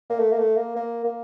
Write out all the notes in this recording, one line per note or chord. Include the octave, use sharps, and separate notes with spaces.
A#3
A3
A#3
A3
A#3
A#3
A#3